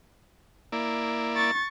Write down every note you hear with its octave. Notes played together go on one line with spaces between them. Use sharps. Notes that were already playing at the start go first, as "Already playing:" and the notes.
A#3 E4 D5
C#6 A6